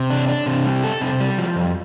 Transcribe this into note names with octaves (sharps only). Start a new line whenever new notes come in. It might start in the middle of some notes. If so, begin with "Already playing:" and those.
Already playing: C3
D4
D4
C3
G3
A4
C3
G3
F3
F2